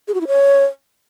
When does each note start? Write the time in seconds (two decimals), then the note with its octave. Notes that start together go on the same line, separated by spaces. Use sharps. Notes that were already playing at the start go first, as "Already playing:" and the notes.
0.08 G#4
0.14 F#4
0.21 E4
0.27 C#5